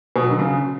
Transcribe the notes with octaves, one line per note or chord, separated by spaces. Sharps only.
B2
F#3
D3
C#3